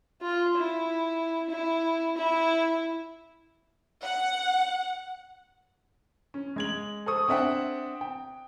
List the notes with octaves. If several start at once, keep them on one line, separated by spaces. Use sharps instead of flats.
F4
E4
E4
E4
F#5
C#4
G#3 G#6 F#7
A4 C5 C#6 D#6
C4 D4 E5 F#5 G5
G5